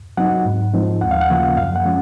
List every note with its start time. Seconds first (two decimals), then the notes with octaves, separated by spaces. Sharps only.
0.17 F#3 C4 D#4 F#5
0.45 G#2
0.73 F3 G#3 C4 D#4
1.01 D#2 F#5
1.11 F5
1.21 F#5
1.30 C#3 F3 A#3
1.57 F#2 F5
1.76 F#5
1.85 F3 G#3 C#4